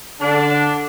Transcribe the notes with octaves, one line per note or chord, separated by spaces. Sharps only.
D3 D4